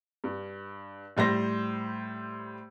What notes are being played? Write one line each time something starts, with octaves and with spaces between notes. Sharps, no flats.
G2
A2 G3 C5 A#6